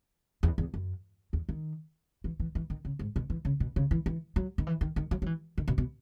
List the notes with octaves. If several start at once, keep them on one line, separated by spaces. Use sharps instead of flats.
E2
E2
F#2
E2
D#3
E3
E3
E3
D#3
C#3
G#2
B2
E3
C#3
B2
C#3
E3
E3
F#3
D#3
E3
D#3
D#3
F#3
F#3
E3
D#3
B2
B2